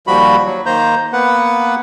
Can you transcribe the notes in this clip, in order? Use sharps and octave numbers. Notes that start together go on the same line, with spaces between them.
D#2 F3 G3 F#4 B5
F#3
D#3 A#3 C5 A#5 G6
A#3 B3 B4 F#5